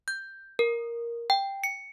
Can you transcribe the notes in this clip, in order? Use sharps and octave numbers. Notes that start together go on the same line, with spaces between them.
G6
A#4
G5
C#7